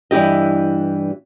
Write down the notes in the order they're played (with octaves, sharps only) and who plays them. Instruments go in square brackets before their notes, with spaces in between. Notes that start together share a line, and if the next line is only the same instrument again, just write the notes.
[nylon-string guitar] G2 E3 E4 G4 D#5